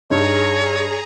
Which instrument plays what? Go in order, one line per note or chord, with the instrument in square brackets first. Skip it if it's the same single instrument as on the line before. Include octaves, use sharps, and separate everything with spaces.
[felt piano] G2 D#4 [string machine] G#4 A#5 [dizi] C#5